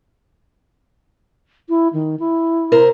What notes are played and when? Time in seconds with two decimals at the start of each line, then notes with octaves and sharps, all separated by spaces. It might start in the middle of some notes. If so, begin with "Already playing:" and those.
1.69 E4
1.93 D#3
2.19 E4
2.72 C3 A#4 C5